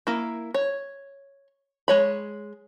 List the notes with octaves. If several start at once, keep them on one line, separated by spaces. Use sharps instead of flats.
A#3 E4
C#5
G#3 C#5 B5